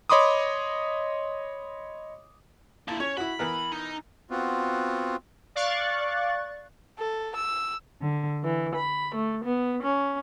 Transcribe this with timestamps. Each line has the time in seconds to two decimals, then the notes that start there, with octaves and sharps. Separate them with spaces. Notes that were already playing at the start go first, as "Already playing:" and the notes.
0.10 C#5 D#5 B5 C6 D6 D#6
2.88 D3 A#3 E4 A5
3.00 C#4 C#5
3.17 E4 F#4 B5
3.39 E3 B3 A#4
3.72 D#4
4.30 B3 C4 F4 F#4
5.55 D5 F5 C#6 F#6 A6
6.99 A4
7.35 E6
8.02 D3
8.44 E3
8.75 B5
9.15 A3
9.44 B3
9.83 C#4